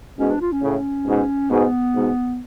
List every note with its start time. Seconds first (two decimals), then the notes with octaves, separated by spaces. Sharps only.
0.19 G#2 B2 C#4
0.30 D4
0.41 F4
0.52 C#4
0.62 A2 C#3
1.06 G#2 B2
1.50 G#2 B2 B3
1.94 G#2 B2